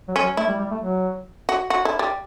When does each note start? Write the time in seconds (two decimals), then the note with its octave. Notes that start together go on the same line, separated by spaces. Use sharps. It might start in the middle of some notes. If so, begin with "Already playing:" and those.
0.08 F#3
0.16 C#4
0.23 F#3
0.37 A3 E4
0.49 G3
0.60 G3
0.71 A3
0.82 F#3
1.49 F#4
1.70 F#4
1.85 E4
1.99 G3